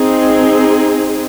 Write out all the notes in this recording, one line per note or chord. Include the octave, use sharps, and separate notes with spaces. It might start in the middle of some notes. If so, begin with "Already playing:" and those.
Already playing: C4 D#4 G#4